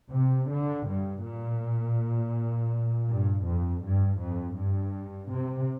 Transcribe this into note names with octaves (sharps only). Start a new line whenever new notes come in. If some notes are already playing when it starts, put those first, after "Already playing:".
C3
D3
G2
A#2
G2
F2
G2
F2
G2
C3